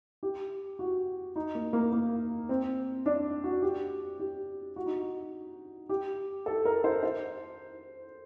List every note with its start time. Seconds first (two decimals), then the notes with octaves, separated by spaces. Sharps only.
0.23 G4
0.79 F#4
1.36 D#4
1.55 A#3
1.73 A#3
1.92 A#3
2.49 C4
3.06 D4
3.44 F#4
3.62 G4
4.20 G4
4.76 F#4
4.86 D#4
4.96 F#4
5.89 G4
6.46 A4
6.65 A#4
6.84 C5
7.03 C5